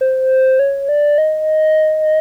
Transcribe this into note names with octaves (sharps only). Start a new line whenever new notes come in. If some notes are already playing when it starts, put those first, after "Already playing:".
C5
C#5
D5
D#5